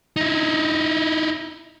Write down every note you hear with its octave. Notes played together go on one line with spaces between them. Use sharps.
D#4 E4